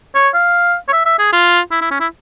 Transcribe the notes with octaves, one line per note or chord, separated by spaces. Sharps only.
C#5
F5
C#5
E5
E5
G#4
F4
E4
E4
C#4
E4